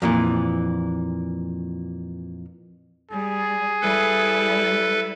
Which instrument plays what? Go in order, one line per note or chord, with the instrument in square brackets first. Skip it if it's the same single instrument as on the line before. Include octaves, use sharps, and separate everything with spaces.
[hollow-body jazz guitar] F2 A#2 E3
[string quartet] G3 [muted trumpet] G#4
[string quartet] G3 E4 [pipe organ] A4 B4